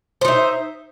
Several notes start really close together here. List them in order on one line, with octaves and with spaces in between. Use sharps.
C5 D#4 E5